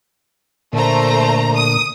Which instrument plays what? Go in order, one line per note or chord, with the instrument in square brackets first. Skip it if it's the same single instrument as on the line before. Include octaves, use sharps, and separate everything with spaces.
[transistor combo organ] A#2 D3 [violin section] A3 C5 A#5
[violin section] D#6